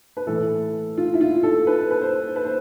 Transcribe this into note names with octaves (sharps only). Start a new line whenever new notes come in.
B4
A2 E3 A4
F4
E4
F4
A4
B4
B4
C5
B4
C5